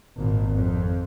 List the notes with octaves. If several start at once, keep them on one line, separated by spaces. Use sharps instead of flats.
G#1 A#2
F2